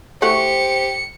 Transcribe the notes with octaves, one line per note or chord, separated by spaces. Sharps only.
A3 E4 F#4 G4 C5 C#7